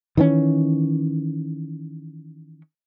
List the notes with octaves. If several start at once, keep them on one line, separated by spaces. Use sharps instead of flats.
D#3 E3 B3 C#4